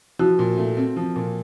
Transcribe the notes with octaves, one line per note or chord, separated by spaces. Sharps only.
F3 E4 F#4
A#2
A3
C4
F3
A#2